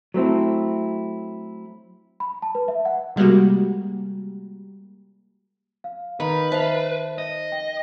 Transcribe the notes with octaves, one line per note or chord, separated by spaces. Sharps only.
F#3 A3 C4 E4
B5
A5
B4
E5
F#5
C3 G3 G#3 A#3 F#4
F5
D#3 B4
C5 E5 F5 A5
D#5
G5